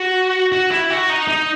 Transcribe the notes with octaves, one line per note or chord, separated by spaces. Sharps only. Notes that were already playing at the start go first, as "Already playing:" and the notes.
Already playing: F#4
F#4
E4
F#4
D#4
D#4